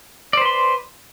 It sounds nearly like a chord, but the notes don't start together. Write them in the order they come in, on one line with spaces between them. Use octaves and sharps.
D5 C5 B4 C6